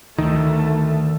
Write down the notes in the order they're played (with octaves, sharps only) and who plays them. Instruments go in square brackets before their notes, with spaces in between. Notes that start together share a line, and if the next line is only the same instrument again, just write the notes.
[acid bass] D2 [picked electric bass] D#3 [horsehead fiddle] A3